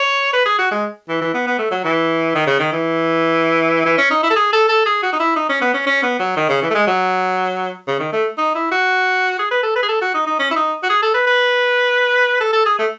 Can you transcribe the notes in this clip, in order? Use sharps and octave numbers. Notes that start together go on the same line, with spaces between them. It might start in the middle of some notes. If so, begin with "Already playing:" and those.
Already playing: C#5
B4
G#4
F#4
G#3
E3
E3
B3
B3
A3
F#3
E3
D#3
C#3
D#3
E3
E3
C#4
D#4
E4
A4
G#4
A4
A4
G#4
F#4
D#4
E4
D#4
C#4
B3
C#4
C#4
B3
F#3
D#3
C#3
E3
A3
G#3
F#3
C#3
D#3
A3
D#4
E4
F#4
G#4
B4
A4
B4
G#4
A4
F#4
D#4
D#4
C#4
E4
D#4
F#4
G#4
A4
B4
B4
A4
A4
G#4
A3